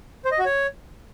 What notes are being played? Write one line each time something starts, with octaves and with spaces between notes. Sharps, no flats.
C5
D#5
F#4
C#5